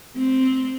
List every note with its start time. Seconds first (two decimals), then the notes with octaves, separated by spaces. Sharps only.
0.18 C4